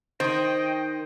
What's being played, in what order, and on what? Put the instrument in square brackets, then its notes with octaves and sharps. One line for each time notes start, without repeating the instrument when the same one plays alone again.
[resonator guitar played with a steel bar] D#3 [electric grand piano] C5 [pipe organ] D#5 G5